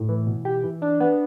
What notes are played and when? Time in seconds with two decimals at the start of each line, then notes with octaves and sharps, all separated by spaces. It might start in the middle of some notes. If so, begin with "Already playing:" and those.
Already playing: A2
0.09 E3
0.27 B2
0.45 G4
0.64 E3
0.82 D4
1.00 B3